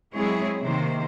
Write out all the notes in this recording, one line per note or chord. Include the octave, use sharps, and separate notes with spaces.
F#3 G#3 C4 E4 G#4 C#5
C3 D#3 A#3 C5